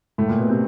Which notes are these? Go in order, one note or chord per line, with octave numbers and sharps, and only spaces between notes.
A2 A3
A#2 A#3
B2 B3
C3 C4